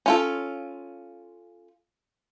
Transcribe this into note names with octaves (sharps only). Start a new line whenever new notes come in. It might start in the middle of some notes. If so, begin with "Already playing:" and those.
C#4 F4 A4